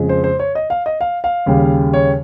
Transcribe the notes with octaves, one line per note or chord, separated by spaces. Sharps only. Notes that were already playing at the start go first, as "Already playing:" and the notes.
Already playing: F2 C#3 G#3
C5
C5
C#5
D#5
F5
D#5
F5
F5
D#2 C#3 G3
C#5